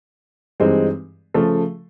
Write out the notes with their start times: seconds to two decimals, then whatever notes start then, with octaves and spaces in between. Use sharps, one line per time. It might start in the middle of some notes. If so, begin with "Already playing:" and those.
0.60 G2 E3 G#3 C4 D#4
1.34 C#3 F3 A3